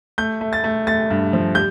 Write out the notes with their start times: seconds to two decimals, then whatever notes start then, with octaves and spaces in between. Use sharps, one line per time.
0.18 A3 G6
0.41 A3
0.53 A6
0.64 A3
0.87 A3 A6
1.10 G2
1.33 F3
1.55 G3 G6